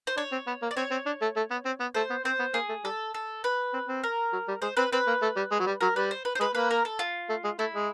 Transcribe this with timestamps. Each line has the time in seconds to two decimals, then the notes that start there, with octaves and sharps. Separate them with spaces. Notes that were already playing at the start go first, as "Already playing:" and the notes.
0.07 C5
0.17 D4 C#5
0.32 C4
0.47 B3
0.62 A#3
0.71 D5
0.77 C4 C#5
0.91 C4
1.06 D4
1.21 A3
1.36 A3
1.51 B3
1.65 C4
1.80 B3
1.95 A3 C5
2.10 B3
2.25 C4 C5
2.39 B3
2.54 A#3 G#4
2.69 A3
2.84 G3 A4
3.14 A4
3.44 B4
3.73 C4
3.88 C4
4.03 A#4
4.33 F#3
4.48 G3
4.62 G#3 C5
4.77 C4 B4
4.93 C4 B4
5.07 A#3
5.22 A3
5.36 G3
5.52 G#3
5.60 F#3
5.66 G3
5.81 F#3 A#4
5.96 G3 B4
6.11 C5
6.25 B4
6.35 C5
6.40 G#3 B4
6.55 A#3 B4
6.71 A#4
6.85 A4
6.99 F4
7.29 A3
7.44 G#3
7.59 A3 E4
7.75 G#3